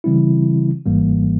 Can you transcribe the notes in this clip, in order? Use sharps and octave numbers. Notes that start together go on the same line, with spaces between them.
C#3 E3 G3 C4 E4
G#1 G#2 E3 G3 A#3